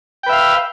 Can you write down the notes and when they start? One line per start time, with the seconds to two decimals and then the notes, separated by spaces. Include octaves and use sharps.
0.23 G5
0.26 B4
0.29 E5
0.32 F5